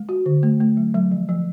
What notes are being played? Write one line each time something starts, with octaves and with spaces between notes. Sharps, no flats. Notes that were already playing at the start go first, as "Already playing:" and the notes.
Already playing: G#3
F#4
D3
A3
A3
F#3
F#3
F3
F3